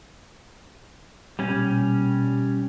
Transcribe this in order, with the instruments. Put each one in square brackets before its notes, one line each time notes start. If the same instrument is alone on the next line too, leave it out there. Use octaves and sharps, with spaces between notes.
[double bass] A#1 B2 [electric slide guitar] G3 C#4